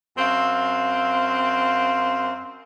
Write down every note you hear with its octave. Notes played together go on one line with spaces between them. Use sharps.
F#2 C4 F5